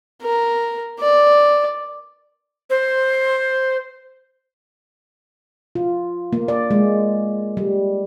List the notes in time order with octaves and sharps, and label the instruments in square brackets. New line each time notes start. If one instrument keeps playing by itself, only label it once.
[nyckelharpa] A#4
D5
[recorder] C5
[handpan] F4
A#3
D5
G#3
G3